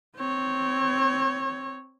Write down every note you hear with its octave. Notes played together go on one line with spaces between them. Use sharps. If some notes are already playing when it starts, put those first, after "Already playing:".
C4 C#5